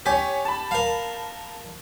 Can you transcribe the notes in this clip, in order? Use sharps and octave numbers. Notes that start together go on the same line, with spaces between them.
G4 C#5 G#5 B6
A5 B5
A#4 F5